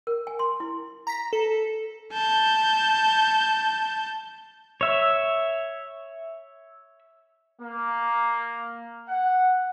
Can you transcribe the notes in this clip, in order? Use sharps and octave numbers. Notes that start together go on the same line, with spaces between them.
A#4
G#5
C6
E4
A#5 A#6 B6
A4
A5 G6
C#5 E5
A#3
F#5